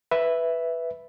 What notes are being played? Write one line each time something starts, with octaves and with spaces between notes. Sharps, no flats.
B4 E5